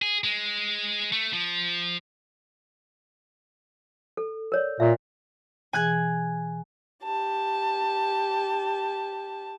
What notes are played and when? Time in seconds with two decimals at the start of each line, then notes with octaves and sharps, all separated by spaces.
0.02 G#4
0.24 G#3
1.12 A3
1.33 F3
4.17 A4
4.52 A#4 C#5 D5
4.80 A#2 E5
5.73 B2 E3 G#4 G#5 F#6 G#6
7.04 G4 A5